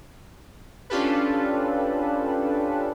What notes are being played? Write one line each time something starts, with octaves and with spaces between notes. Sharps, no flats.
C#4 D4 F4 G4 A4 B4